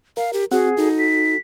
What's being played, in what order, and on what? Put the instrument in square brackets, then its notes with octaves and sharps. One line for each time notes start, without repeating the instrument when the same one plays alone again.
[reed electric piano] A#4 [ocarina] F5
[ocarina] G4
[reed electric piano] C4 F#5 [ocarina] F#4 [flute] G#4
[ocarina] D#4 [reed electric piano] F#4 A4
[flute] B6